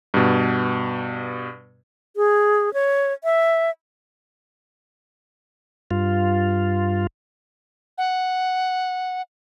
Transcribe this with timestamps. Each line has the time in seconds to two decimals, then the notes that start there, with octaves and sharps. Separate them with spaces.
0.14 G2 B2
2.16 G#4
2.74 C#5
3.24 E5
5.91 G2 F4
7.98 F#5